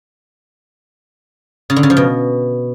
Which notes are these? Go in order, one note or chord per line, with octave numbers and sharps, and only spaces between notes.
C#3
D3
C#3
F3
B2